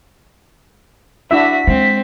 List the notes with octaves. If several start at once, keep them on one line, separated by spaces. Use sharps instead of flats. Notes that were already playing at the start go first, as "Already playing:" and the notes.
D4 E4 F#4 E5 B6
G#3 C4